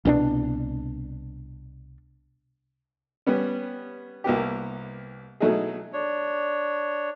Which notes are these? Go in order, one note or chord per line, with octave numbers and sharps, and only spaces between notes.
C2 B2 C4 D4
G3 B3 C#4
C2 A#3 B3 G4
B2 F#3 A3 D#4 E4 G#4
D4 C#5